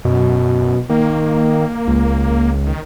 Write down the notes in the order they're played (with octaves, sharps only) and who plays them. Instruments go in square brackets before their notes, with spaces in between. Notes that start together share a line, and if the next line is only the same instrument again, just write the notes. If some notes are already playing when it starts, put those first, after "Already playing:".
[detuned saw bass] F#2 [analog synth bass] B2
[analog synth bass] D#3 [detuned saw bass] A#3
[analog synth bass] C#2
[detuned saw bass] D#3